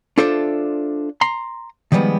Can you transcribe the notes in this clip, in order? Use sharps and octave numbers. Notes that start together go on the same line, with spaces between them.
D4 F4 A4 C5 D5 E5
A#5 C6
D#3 F3 G3 G#3 B3